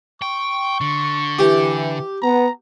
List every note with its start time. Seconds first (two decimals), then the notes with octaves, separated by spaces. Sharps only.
0.22 G5 C#6
0.81 D3
1.39 E3 G4
2.22 B3 A#5